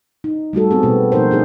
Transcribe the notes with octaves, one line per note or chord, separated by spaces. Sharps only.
D#4
G3 A3 F#4 A4
B3 C4 G#4
B2 B3
F3 A#3 D#4 A#4 C5
D4 D#4 G#4